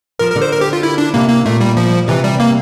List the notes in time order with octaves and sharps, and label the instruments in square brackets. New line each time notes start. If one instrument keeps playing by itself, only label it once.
[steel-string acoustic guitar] F3 [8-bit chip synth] A#4
[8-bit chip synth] A#4
[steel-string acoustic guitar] D3
[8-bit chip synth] C5
A#4
G4
F4
E4
D4
[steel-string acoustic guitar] C3 [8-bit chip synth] A#3
[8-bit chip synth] A#3
[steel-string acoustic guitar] A#2 [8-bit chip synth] A3
[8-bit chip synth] G3
F3
[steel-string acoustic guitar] C3 [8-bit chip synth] E3
[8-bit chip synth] G3
A#3